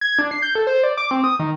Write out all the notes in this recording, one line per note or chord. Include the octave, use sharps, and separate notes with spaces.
G#6
D4
C7
G6
A4
C5
D5
D6
C4
D#6
D#3